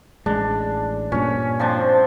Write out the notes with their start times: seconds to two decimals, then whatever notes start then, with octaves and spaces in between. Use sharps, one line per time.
0.26 A1 G#3 D4
1.12 G2 A#2 C#4
1.59 F3 C4 D4